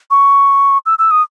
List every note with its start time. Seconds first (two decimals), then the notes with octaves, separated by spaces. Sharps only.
0.11 C#6
0.86 E6
0.99 E6
1.11 D#6